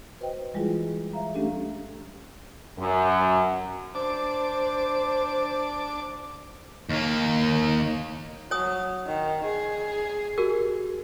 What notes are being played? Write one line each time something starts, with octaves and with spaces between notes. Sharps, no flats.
F#4 B4 C5 D#5 G5
E3 G3 G#3 E4 F4 G#4
C#5 E5 F5 A#5
G3 A3 C#4 D4 G4 A4
F#2
D4 C5 A5 D6
D#2 A#3
F#3 C#5 G#5 D#6
D#3
G#4
F#4 G4 A#4